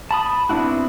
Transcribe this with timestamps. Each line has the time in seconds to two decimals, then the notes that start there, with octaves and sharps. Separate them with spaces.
0.11 A5 B5 D#6
0.49 B3 C4 D4 E4 F#4